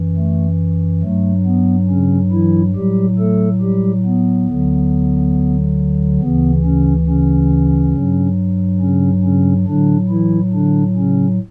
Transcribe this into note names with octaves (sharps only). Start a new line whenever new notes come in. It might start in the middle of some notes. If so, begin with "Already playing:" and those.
Already playing: F#2 E3
A3
G2 F#3 A3
B3
C#3 C#4
E3 E4
A2 F#3 G3 G4
A3 A4
G3 G4
B3
D2 D3 F#3
D2 C#3 E3 B3
C#3 C#4
C#3 C#4
G2 F#3
C#3 C#4
C#3 C#4
A2 D3 F#3 D4
E3 E4
D3 D4
C#3 C#4